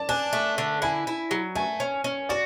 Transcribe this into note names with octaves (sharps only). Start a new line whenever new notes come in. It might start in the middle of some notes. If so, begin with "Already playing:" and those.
Already playing: D5 A5
D4 G#5
A3
D3
E4 G#5
E4
F#3
A3 G#5
C#4
C#4
F#4 D5